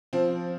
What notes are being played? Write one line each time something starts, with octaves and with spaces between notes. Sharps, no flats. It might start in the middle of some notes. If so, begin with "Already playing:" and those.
F3 C4